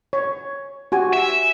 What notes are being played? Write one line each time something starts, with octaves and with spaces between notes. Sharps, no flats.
C#5
F#4 G4 G#5
E5